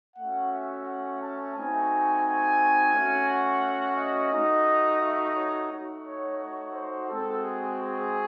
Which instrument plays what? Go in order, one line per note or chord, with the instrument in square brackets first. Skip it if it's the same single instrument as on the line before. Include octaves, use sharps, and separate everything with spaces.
[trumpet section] A3 C#4 F#4 F#5
E5
F#5
A5
A3 C4 D#4 F#4 G#5
G#5
A3 C#4 F#4
F#5
D#5
A3 D#4 F#4
E5
C#5
A3 D#4 F#4
C#5
C#5
C5
G#3 C4 F#4 A4
G#4
G#4